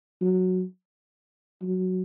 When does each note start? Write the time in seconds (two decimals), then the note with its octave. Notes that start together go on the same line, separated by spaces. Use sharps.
0.22 F#3
1.62 F#3